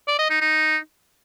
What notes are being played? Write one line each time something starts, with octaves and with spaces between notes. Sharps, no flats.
D5
D#5
D#4
D#4